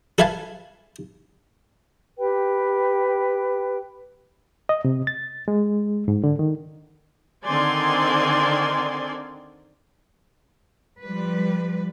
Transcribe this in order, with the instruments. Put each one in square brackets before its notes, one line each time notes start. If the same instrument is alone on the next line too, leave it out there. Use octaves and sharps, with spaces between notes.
[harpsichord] A4 B4 E5 F5 G#5 A5
[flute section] G4 B4 G5
[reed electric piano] D#5
C3
A6
G#3
G#2
D3
D#3
[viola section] D3 D#3 C4 D5 G#5 C6
[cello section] F3 G3 B4